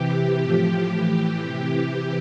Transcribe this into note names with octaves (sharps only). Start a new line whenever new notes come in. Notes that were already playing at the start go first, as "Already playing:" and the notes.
Already playing: C3 E3 G4
A2 F3
A2 E3 G4
C3 E3